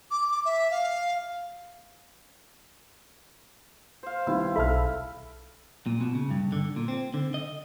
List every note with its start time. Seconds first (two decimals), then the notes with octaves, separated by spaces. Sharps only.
0.11 D6
0.31 D6
0.45 E5
0.71 F5
4.03 C5 F5
4.27 C2 D#3 B3 E4 F5
4.56 B1 A4 E5 A5 B5 F6
5.86 A#2
6.01 B2
6.15 C#3
6.30 G2
6.52 D3
6.76 A#2
6.88 C4
7.14 D3
7.34 D#5